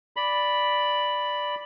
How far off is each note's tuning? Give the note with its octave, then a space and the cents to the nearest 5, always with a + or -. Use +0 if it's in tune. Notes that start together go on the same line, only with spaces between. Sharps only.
D5 +0 B5 +0